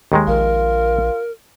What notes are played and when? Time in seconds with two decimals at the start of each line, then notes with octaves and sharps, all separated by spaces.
0.12 D#2 D#3 G#3
0.27 A#1 F4 A#4